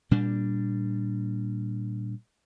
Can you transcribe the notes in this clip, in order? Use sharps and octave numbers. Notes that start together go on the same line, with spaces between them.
A#2 G3 D4